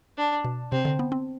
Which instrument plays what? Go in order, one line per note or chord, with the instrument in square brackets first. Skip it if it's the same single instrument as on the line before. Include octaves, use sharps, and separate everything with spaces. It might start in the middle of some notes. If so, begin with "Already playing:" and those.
[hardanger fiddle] D4
[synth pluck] B2
[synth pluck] C3 [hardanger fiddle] C4
[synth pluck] D3
B3
C4